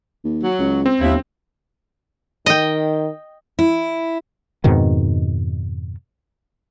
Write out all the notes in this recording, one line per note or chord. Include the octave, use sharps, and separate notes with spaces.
D#2
F#3
C#2
C4
G1 D#2 E4
D#3 D#5 G5
E4
F2 G#2 B2 D#3